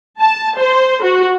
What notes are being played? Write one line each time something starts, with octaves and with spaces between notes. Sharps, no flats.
A5
C5
F#4